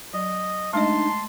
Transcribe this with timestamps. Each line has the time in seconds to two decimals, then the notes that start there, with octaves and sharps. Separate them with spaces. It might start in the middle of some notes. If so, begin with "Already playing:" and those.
0.13 F#3 D#5
0.73 G#3 A3 D4 D#4 D#5 A5 C6